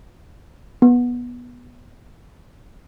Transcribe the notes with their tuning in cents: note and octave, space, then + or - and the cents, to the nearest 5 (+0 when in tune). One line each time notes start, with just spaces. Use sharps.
B3 -15